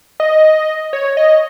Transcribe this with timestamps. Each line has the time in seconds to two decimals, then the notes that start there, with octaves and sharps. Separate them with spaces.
0.20 D#5
0.93 C#5
1.17 D#5